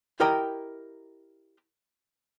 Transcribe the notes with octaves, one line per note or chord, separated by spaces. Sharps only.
E4 G4 A#4 D#5 G5 A#5